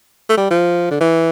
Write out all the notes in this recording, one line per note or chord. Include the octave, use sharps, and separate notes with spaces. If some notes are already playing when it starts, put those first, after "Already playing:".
A3
G3
F3
D3
E3